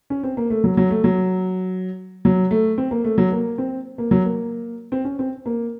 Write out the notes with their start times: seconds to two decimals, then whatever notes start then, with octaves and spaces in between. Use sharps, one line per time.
0.10 C#4
0.23 C4
0.37 A#3
0.50 A3
0.64 F#3
0.77 F#3
0.91 A3
1.04 F#3
2.25 F#3
2.51 A3
2.78 C4
2.91 A#3
3.04 A3
3.18 F#3
3.32 A#3
3.58 C4
3.98 A#3
4.11 F#3
4.25 A#3
4.92 C4
5.05 C#4
5.19 C4
5.46 A#3